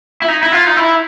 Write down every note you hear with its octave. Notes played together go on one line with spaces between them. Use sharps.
E4
D#4
E4
F4
D#4
E4